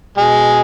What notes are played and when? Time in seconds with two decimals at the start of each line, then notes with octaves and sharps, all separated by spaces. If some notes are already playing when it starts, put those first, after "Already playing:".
0.17 B2 G#3